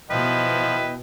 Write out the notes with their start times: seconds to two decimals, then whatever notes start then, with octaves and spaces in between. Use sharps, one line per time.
0.11 B2 F3 E4 B4 D#5 G5